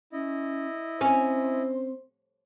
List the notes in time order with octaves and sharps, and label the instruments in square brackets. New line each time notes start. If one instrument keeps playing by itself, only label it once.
[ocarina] C#4 [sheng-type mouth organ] E4 D#5
[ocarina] C4 [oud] C#4 [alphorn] C5